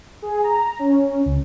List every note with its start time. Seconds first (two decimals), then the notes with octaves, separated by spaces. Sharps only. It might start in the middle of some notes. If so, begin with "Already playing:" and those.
0.22 G#4
0.44 A#5
0.79 C#4
1.25 C#2